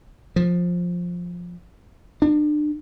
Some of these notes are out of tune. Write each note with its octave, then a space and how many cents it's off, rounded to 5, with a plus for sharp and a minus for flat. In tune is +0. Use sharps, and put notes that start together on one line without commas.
F3 +10
D4 +35